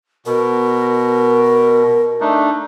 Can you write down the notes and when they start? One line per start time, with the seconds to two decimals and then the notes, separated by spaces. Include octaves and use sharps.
0.26 B2 A#4
2.21 A3 D4 D#4